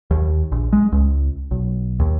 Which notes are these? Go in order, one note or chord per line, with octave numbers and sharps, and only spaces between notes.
D#2
A#1
G#3
C#2
B1
D#2